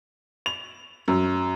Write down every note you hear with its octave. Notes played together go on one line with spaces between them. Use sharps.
F7
F#2